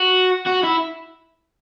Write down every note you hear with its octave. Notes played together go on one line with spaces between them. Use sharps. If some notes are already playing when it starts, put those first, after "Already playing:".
Already playing: F#4
F#4
E4